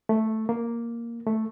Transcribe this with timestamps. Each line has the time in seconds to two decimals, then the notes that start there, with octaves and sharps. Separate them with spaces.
0.09 A3
0.49 A#3
1.27 A3